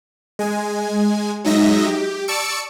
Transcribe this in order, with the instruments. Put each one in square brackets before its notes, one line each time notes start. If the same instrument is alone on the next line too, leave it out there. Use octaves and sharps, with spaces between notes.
[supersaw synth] G#3 G#5
F#3 G#3 D#4 D#5 E5 A#6
G4
D5 A5 C#6 E6 C#7 D7